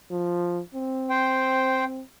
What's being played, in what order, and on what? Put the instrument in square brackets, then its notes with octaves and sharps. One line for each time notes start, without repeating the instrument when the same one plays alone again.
[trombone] F3
C4
[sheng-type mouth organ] C5 G5